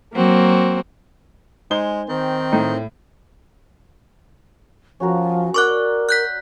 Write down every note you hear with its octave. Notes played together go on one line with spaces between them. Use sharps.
F#3 A#3 C4 F#4
G#3 D#4 C5 G#5 G7
D#3 C4
A2 D#4
F3 C#4 F#4 A#4
A#4 D5 F#5 C#6 D6 F#6
F#6 G6 B6